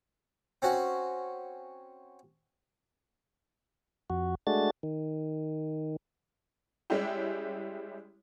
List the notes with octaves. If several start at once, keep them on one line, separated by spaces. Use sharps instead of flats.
C4 C#4 F#4 F#5
F2 F#4
G#3 A3 D4 F#4 A6
D#3
G3 G#3 C#4 E4 G4